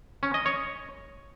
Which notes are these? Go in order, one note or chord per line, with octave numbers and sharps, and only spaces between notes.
C#4
D#5
C#5